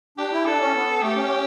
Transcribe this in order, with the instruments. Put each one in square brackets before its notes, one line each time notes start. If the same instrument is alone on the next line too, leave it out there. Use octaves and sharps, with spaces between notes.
[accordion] D4 [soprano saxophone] G4
[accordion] E4
[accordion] D4 [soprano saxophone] A4
[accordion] C#4
B3
[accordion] A3 [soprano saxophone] G4
[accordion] C#4